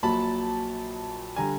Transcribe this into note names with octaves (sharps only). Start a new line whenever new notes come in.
A#1 A#2 F#3 A5 B5
D3 G3 G#5 A#5